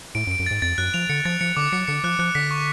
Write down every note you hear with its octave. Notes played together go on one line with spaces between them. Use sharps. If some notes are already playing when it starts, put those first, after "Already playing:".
A2 D7
F#2
D7
F#2
G#2 A6
F2 A6
F#2 F#6
F3 F7
D3 C#7
F3 A6
F3 C#7
D3 D6
F#3 C#7
D3 C#7
F3 F#6
F3 F#6
D3 B6
C#6